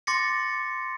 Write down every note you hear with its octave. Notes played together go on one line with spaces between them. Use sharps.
C6 D6 A6 A#6 C#7